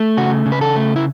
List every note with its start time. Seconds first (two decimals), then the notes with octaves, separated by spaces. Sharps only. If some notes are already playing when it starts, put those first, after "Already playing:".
Already playing: A3
0.17 C#3 F#4
0.46 C#3
0.52 B4
0.61 A4
0.76 A3
0.96 E4